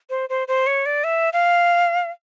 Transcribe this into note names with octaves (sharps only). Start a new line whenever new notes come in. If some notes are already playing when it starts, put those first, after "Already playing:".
C5
C5
C5
C#5
D5
E5
F5